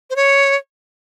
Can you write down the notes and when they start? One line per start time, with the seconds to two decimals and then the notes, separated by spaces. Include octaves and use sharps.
0.10 C5
0.16 C#5